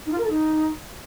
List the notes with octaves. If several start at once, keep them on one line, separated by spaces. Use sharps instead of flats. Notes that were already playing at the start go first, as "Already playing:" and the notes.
D#4
F4
A#4
A4
D#4